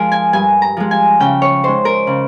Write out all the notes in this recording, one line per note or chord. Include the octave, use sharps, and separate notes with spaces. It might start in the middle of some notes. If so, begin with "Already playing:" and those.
Already playing: F3 G#3 G#4 A#4
G#5
G2 G#5
A#5
F3 G#3
G#5
C#3 G5
C#5
G#3 D#4 C5
A#4
C#3